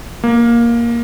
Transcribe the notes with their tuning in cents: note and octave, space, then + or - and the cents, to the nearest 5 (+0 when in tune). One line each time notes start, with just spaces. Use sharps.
A#3 +10